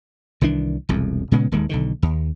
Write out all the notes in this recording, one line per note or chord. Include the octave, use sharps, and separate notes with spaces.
C2 D#3 E3 D4
E1 C2 F2
A#2 C#3 G#3 B3
D#1 D#2 D#3 G#3
B1 D3 D#3
D#2